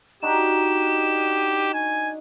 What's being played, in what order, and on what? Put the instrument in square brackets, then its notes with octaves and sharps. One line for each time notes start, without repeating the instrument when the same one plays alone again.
[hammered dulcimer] D4 D#4 F#4 [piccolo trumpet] G4 [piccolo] E7
[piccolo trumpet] G#5